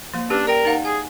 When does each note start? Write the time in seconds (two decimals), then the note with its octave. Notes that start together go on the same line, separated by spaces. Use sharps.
0.13 F3 A#3
0.30 C#4 D4 G4 B4
0.47 A#4 D5 G5
0.65 D#4 F5 F#5
0.85 G#4 G#5